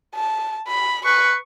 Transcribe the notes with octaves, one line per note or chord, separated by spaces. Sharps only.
A5
B5
B4 C#6